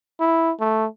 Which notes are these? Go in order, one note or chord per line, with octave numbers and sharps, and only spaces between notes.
E4
A3